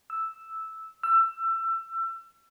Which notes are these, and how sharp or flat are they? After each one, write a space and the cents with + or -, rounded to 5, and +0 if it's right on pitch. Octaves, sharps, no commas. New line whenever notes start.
E6 -5
E6 +25